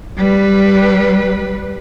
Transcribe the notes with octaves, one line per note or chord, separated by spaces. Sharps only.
G3 B4